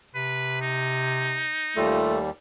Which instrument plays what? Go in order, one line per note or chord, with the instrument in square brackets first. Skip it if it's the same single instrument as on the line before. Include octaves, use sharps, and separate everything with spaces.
[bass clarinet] C3 [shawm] B4
[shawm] D#4
[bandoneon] D#2 G3 [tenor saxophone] A3 [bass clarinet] F4